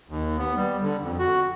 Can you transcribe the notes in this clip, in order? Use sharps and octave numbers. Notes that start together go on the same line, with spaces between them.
D#2
B3
G3
D3
F2
F#4